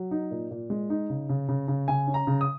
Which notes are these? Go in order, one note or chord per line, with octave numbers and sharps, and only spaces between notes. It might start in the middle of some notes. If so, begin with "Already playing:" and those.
Already playing: F#3
D#4
A#2
A#2
G#3
D#4
C#3
C#3
C#3
C#3
C#3 G#5
C#4
A#5
C#3
D#6